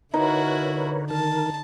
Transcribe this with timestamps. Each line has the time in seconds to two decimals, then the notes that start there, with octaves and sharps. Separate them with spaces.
0.14 D3 D#4 E4 F#4 A#4 B4 C#5
1.10 D#3 A#4 A5